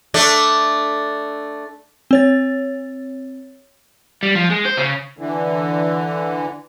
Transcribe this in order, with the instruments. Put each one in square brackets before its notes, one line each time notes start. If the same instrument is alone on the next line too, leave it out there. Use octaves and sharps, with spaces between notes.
[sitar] A3 D4
[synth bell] C4 C#5 A6
[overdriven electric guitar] G3
F3
G#3
C5
C#3
[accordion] D3 E3